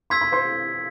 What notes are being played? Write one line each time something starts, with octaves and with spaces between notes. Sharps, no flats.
C6 E6 G#6 B6
B5
C5 C6